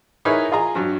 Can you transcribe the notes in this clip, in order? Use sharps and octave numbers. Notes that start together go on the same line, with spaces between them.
D#4 E4 G#4 A#4 B4 C#5
F4 G#4 D#5 A#5
G2 F#3